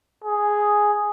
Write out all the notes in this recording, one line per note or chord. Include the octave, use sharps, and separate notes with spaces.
G#4